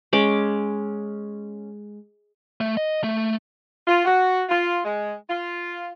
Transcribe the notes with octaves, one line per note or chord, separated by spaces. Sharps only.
G#3 C#4 D6
A3
D#5
A3
F4
F#4
F4
G#3
F4